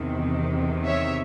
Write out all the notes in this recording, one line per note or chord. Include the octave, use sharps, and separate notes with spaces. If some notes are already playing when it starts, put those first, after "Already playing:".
Already playing: E2 C3 D#3
C#5 E5